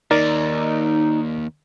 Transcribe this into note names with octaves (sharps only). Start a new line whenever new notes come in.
D#2 D#4 A#4 D5 A6